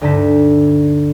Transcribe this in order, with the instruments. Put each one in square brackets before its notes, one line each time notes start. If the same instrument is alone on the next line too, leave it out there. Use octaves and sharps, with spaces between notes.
[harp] D2 G2 D3 D#4 A5 B6